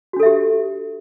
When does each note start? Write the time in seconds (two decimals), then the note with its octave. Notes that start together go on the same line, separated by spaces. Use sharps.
0.13 F#4
0.16 D4
0.20 A4
0.23 E5
0.26 G4